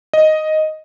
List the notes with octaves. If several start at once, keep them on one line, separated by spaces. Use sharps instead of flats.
D#5